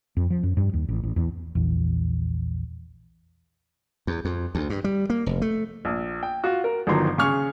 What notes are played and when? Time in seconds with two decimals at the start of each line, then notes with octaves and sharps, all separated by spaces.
0.17 F2
0.30 F3
0.43 F#2
0.57 G2
0.74 D#2
0.89 A1
1.03 A1
1.16 E2
1.55 A#1 E2
4.07 E2
4.25 F2
4.55 D2
4.70 G2
4.84 G3
5.10 A#3
5.26 F1
5.42 A3
5.85 A#1
6.23 G5
6.44 F4 F#4
6.64 A#4
6.87 G1 D#3 F3 F#3 A#5 C6
7.18 C#3 G#4 C#6 F6